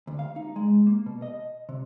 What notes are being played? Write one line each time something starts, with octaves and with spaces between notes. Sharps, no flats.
D2
F5
D#4
G#3
A#3
B2
D#5
C3